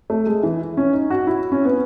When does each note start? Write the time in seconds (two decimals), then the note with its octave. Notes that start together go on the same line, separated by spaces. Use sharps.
0.10 A3
0.27 G#3
0.43 E3
0.77 C#4
0.93 D#4
1.10 F#4
1.27 E4
1.52 C#4
1.65 B3